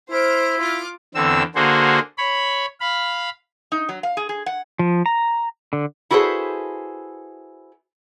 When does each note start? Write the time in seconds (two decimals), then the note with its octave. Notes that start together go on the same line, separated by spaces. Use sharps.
0.11 E4 C5 F6 D7
0.58 F4 D6 F6
1.15 E2 D3 C4 E6
1.55 D3 A#3 F#4 G#4 C5
2.18 C#5 B5
2.80 F5 B5
3.72 D#4
3.89 F#3
4.03 F5
4.17 G#4
4.29 G#4
4.46 F#5
4.79 F3
5.06 A#5
5.73 D3
6.11 E4 F#4 G#4 A4 B4 C5